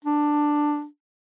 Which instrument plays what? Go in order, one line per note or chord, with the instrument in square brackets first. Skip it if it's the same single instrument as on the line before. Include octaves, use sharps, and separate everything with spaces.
[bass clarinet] D4